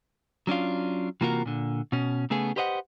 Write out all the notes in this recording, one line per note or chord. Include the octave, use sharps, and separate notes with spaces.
F#3 C#4 D4 F4
C3 E3 A#3 F4 F#4 A#4
A#2 D3
B2 C#4
C#3 A3 B3 G#4
G4 B4 C5 D#5 E5 F#5